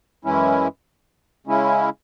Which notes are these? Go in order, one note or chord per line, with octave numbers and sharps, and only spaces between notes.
F#2 E3 G#3 C#4 E4
C#3 G#3 C#4 E4